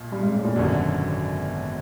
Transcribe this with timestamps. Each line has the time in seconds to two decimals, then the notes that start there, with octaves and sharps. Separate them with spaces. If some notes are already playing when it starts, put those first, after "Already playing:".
Already playing: B1 A#2
0.12 G2
0.22 G#2
0.34 A2
0.44 A#2
0.56 G#1 F#2 B2 D3